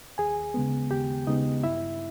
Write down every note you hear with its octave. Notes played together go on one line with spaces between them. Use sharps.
D#2 G#4 G#5
C#3 G#3 B3
D#2 G4 G5
C#3 G#3 B3 D#4 D#5
G2 E4 E5